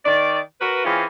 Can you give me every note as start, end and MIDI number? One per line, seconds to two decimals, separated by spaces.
0.05 0.39 51
0.05 0.39 74
0.60 0.85 66
0.60 0.85 70
0.60 0.85 71
0.85 1.04 52
0.85 1.04 60
0.85 1.04 61
0.85 1.04 65
0.85 1.04 68